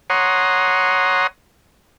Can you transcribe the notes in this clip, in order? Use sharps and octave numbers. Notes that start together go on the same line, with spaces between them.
C#5 F#5 A#5 C6 D#6